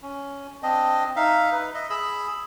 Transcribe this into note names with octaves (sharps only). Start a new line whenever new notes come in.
C#4
C4 D4 D#5
D#4 E5 F5
D#4 B4
D#5 E5
G#4 B5 E6